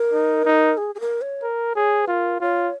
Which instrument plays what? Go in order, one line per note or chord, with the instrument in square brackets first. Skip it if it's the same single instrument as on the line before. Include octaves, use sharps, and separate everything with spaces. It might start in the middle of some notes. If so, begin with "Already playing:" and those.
Already playing: [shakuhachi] A#4
[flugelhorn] D#4
D#4
[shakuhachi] G#4
G#4
A#4
C#5
[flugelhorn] A#4
[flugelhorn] G#4 [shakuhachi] C#5
[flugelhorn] F4 [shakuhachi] A#4
[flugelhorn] F4 [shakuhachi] C#5